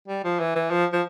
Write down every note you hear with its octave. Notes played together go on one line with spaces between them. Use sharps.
G3
F3
E3
E3
F3
F3